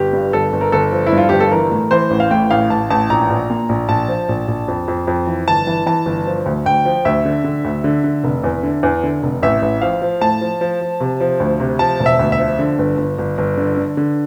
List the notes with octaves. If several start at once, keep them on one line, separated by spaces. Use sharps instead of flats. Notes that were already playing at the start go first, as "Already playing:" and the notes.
Already playing: G1 G4
G2
G1 A4
G1
A#4
G1 A4
F3
E4
G2 F4
G1 G4
A4
E3 A#4
A2
E3 C5
A1
F5
A2 G5
A1 F5
A1 A5
A1 A5
A#1 A#5
A#1
A#2
A#1
A#1 A5
F3
A#1
A#1
F2
F2
F2
E3
G1 A5
E3
E3 A5
G1
F3
D2
D2 G5
F3
D2 E5
D3
D3
D2
D3
D3
F1
E2
D3
E2
D3
F1
A1 E5
A1
F3 F5
F3
A2 A5
F3
F3
F3
C3
F3
D2
C3
F3 A5
E1
E5
D2
E5
F3
D3
G1
G1
G1
G1
D3
D3
D3